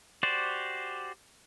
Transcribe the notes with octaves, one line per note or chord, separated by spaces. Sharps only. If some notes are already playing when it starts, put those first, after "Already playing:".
F#4 G4 C5 D5